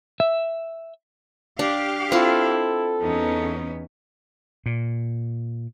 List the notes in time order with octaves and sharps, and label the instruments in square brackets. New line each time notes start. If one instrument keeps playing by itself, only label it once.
[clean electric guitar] E5
[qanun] D4 [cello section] G4 F5
[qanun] C4 F4 [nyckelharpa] E4 [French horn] A4
[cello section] E2 B3 C#4 [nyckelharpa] D#4
[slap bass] A#2